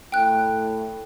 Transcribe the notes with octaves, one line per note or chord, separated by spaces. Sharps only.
A2 G5 F#6